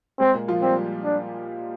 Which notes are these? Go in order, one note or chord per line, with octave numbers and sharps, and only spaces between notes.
G#3 C4
A#2 A#3
F3 F4
G3 C4 G4
D4